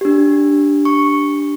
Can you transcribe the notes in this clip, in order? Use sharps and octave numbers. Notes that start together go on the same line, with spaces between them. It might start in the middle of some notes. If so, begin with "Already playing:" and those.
D4 G4
C#6